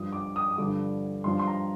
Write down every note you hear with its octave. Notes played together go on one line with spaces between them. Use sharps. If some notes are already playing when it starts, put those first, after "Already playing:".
Already playing: G2 F3 D#6
D6
D#6
D#6
G2 D3 F3 D6
G2 F3 C6
C6
A#5